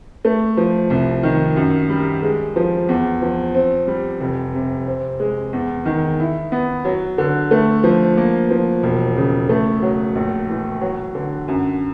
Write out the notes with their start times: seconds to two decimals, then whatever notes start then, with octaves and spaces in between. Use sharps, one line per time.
0.25 A3
0.57 F3
0.90 C2
1.23 D#3
1.56 F#2
1.89 G3
2.23 G#3
2.56 F3
2.89 E2
3.22 F3
3.55 C4
3.88 G3
4.21 F1
4.54 C3
4.87 C4
5.20 G#3
5.53 E2
5.86 D#3
6.19 E4
6.52 B3
6.85 F#3
7.18 D3
7.51 A3
7.84 F3
8.17 A#3
8.51 F3
8.83 E1
9.16 C#3
9.49 A3
9.82 F#3
10.15 A#1
10.48 E3
10.81 F#3
11.15 D3
11.48 F#2